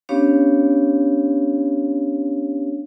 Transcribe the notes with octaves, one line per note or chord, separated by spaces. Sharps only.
B3 C#4 D4 G4 C#5 F5